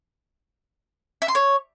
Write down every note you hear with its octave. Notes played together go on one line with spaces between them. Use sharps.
E5
C6
C#5